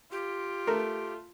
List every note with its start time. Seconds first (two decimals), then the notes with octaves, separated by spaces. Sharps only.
0.12 F4 G4
0.67 A3 A#4